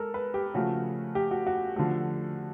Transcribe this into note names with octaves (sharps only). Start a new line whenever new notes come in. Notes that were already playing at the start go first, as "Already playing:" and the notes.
Already playing: G#3 A4 A#4
B4
G4
C#3 F3 A3 F#4
G4
F#4
F#4
D3 F3 A3 F#4